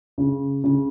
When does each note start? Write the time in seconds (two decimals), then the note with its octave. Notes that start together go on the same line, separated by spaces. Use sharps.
0.18 C#3
0.64 C#3